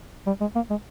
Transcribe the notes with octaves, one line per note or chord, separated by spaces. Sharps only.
G3
G#3
A#3
G#3